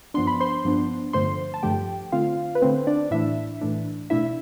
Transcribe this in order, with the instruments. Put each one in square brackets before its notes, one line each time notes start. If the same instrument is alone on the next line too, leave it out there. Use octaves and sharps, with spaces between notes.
[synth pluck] G2 F3 B3 D4 C6
B5
C5 C6
G2 F3 B3 D4
G2 D3 F3 A3 C5 C6
A5
G2 D3 F3 A3 G4 G5
D3 A3 C4 F4 F5
B4
D3 A3 C4 C5
D4 D5
A2 E3 A3 D4 E4 E5
A2 E3 A3 D4
B2 A3 D4 E4 E5